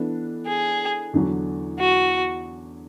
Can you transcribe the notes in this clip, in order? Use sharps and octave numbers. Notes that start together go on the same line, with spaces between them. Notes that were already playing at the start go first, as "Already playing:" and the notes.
Already playing: E3 B3 D4 A4
G#4
E2 D3 F#3
F#4